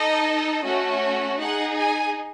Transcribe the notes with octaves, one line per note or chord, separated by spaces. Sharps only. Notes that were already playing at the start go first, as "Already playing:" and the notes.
Already playing: D#4 A4 D#5
A3 C#4 F#4
D#4 G#4 F#5
G#5